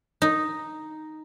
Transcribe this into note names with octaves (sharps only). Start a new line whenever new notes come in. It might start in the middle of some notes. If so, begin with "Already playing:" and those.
D#4